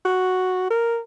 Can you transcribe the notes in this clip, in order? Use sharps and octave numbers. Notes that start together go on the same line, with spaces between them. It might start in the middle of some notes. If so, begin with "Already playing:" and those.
F#4
A#4